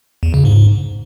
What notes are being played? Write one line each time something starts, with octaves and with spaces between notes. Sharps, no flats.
E2
C#3
G#2